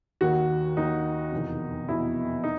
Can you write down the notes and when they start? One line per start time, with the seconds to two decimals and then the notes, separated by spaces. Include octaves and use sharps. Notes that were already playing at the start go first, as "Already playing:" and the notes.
0.21 D#2 D#3 F#4
0.77 D#2 D#3 D#4
1.32 F1 E2 B2
1.88 F1 E2 B2 E4
2.44 D#4